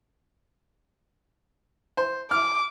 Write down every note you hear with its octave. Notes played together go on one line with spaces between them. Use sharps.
C5
D6 F6